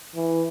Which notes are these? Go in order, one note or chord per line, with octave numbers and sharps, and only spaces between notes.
E3